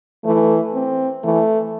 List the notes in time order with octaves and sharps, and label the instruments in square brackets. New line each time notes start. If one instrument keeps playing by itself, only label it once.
[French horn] E3 [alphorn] A3
[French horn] C4
[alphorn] E3 [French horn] A3